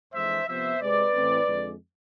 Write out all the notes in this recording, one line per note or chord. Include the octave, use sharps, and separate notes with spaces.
F2 E3 G#3 D4 C5 E5
C3 F3 B3 C5 E5
C3 G#3 C4 B4 D5
A2 E3 A3 C4
F2 D3 G#3